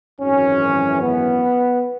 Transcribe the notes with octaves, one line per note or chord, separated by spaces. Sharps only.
G#1 F#2 E3 C#4
B3